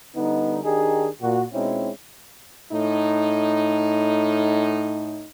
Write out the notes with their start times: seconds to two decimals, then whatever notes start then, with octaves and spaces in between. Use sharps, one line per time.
0.16 D3 G3 B3 D#4
0.64 D#3 D4 D#4 G4 G#4
1.22 A#2 F#4
1.53 B2 G#3 C4 C#4 D#4 E4
2.72 A2 D#4